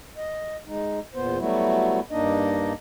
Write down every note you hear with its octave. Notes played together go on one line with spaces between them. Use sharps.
D#5
G#3 D#4
E2 A#2 B3 C5
F#3 G3 A3 B3 E4 F#4
G2 A#3 D4 D#4 D#5